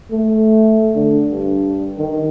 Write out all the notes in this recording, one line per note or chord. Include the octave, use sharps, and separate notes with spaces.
A3
D3
G2
D#3